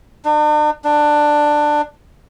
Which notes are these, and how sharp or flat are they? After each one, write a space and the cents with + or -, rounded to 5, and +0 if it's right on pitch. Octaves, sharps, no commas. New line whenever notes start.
D4 +45
D4 +15